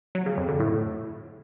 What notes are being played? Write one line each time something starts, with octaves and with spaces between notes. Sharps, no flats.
F#3
C#3
F2
D3
A2